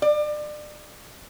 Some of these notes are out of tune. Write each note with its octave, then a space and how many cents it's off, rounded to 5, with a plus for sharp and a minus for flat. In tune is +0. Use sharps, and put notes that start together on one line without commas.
D5 +30